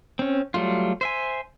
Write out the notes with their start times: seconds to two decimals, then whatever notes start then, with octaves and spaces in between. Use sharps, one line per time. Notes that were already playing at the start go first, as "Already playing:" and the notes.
0.19 C4 C#4
0.54 F#3 G3 A3 F4
1.01 C5 E5 G#5